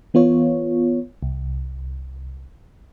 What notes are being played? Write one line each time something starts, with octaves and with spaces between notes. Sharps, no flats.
E3 B3 F4 C#5
C2